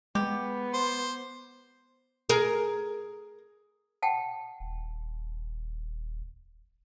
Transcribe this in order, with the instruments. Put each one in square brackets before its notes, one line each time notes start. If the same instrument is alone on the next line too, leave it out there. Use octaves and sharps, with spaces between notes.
[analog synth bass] G#3 [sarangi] B3 [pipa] G4
[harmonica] C5
[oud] G#4 A#4
[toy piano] F#5 G5 A5
[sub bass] D#1